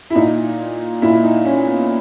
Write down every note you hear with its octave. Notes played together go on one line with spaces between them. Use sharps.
E4
A#2 D#4
A#2 E4
D#4
C#4
B3